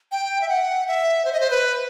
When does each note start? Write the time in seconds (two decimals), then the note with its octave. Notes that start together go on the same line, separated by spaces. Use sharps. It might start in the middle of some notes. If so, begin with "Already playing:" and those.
0.12 G5
0.41 E5
0.49 F#5
0.88 E5
1.25 C5
1.33 D#5
1.40 C5
1.50 B4